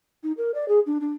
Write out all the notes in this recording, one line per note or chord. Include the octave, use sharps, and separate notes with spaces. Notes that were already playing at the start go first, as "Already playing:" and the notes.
D#4
A#4
D5
G#4
D4
D4